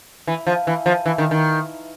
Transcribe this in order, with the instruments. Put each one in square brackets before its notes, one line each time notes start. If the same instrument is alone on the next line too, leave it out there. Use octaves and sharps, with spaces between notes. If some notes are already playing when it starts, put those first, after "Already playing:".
[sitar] E3
F3
E3
F3
E3
D#3
D#3